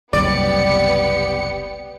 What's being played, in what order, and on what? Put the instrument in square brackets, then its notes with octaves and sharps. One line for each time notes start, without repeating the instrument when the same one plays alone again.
[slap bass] F#1 C2 [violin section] B3 G4 C#7 [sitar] D5